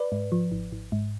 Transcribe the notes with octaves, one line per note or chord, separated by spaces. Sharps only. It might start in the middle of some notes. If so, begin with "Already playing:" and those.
Already playing: B4 D5
G#2
F3
G#1
G#1
G#2